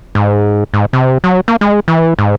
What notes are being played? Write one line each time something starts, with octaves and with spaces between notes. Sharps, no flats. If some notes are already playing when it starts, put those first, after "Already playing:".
G#2
G#2
C3
F#3
A#3
G#3
E3
G#2